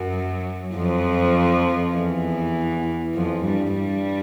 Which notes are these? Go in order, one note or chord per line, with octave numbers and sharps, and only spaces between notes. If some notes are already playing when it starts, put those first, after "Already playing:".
Already playing: F#2 F#3
F2 F3
E2 E3
F2 F3
G2 G3
G2 G3